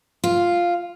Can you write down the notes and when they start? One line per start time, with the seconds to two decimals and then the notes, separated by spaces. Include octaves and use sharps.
0.24 F4